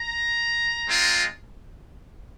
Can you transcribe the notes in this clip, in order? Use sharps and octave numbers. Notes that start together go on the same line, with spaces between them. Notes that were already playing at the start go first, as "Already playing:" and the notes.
Already playing: A#5
G#3 C4 F4